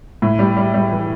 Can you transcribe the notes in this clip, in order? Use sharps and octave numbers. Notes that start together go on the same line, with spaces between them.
A2
G3
G3
G3
E3